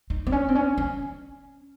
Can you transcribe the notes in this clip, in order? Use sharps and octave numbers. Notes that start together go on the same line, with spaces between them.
D#4
C4
C#4
C4
C#4
C#4